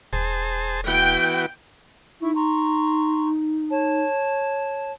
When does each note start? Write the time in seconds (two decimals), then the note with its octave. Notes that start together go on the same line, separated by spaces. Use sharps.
0.13 E1 G#4 C5 A5
0.87 E3 B3 F#4 G5
2.21 D#4 E4 C#6
2.35 A#5 C6 C#6
3.71 C#5 A5